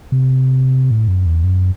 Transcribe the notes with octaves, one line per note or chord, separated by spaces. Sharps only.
C3
A2
F#2
E2
F#2